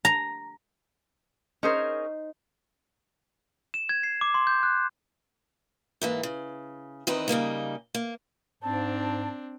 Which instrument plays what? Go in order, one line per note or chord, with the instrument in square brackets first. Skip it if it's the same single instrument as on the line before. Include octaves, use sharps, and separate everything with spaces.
[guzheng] A#5
[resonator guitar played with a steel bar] C#4 G#4 A#4 [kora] D#4 C5
[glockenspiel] E7
G#6
C7
D6
C6
G6
F#6
[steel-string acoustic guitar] G#2 E3 A#3
C#3
E2 D#3 C4 D#4 B4
C#3 G3 A#3 D#4
A#3
[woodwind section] G#2 A5 [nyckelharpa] C4 D4